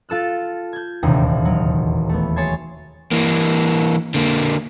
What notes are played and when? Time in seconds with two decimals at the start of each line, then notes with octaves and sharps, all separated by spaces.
0.09 F4 A4 E6 F#6
0.73 G6 G#6
1.03 E1 A#1 D#2 C3 D#4
1.45 F#3
2.09 A3 B3
2.36 G#4 C#5 A5 C6 G#6
3.12 E3 A#3
4.14 D3 A#3